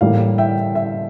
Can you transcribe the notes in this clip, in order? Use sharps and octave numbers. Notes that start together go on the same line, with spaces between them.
A2 E3 G3 A#3 F5
E5 G5
E5